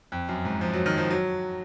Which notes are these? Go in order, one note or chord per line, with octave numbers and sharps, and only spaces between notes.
F2
F#2
G#2
F3
F#3
D#3
F3
F#3